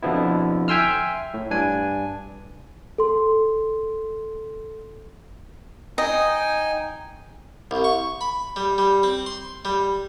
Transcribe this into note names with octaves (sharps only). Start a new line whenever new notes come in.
F2 B2 D3 F3 B3 E4
E5 G5 G#5 C6 E6 F6
A2
G2 D4 G#5
A4 C6
D#4 D#5 G5 G#5
C2
C#6
B5
G3
G3
C4
C6
G3